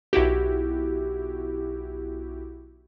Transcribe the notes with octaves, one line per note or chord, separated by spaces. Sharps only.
B1 E4 F#4 G4